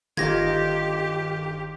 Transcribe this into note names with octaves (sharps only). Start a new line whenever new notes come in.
G1 D#3 D#4 F4 G4 G#6 A#6